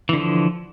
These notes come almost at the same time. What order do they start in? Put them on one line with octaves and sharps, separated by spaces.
E3 D3 F3